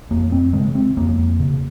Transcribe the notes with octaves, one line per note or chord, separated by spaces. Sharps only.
F2 A#3
C4
C#3 G#3
C4
F2 A#3
C#3